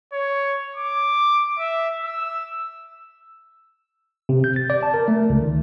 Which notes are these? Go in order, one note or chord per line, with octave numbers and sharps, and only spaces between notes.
C#5
D6
E5
E6
C3
G6
A6
D5
A5
A#4
A3
C#2
D#3